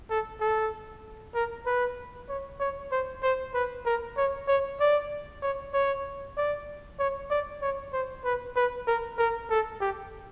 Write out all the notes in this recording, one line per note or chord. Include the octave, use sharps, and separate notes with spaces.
A4
A4
A#4
B4
C#5
C#5
C5
C5
B4
A#4
C#5
C#5
D5
C#5
C#5
D5
C#5
D5
C#5
C5
B4
B4
A#4
A#4
A4
G4